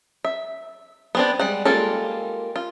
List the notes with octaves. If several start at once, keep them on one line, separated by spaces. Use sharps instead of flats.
E5
B3 C4 D4
G3 G#3 F#5
G3 G#3 A#3 F4 A4
F4